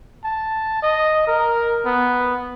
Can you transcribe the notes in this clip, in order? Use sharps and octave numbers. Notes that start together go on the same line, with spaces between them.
A5
D#5
A#4
B3